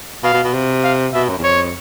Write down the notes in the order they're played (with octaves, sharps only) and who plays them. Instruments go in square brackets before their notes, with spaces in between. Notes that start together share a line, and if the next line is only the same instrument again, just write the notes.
[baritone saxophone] B2 [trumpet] F5
[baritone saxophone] B2
B2
C3
[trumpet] F5
[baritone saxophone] B2 [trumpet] E5
[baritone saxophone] F#2
E2
[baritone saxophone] F2 [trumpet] C#5